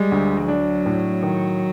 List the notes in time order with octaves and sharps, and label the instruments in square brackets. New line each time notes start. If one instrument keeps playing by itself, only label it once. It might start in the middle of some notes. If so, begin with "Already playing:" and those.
Already playing: [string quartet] G3 [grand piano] G#3
[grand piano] D2
[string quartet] F#3 [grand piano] D4
[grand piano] A2
D#3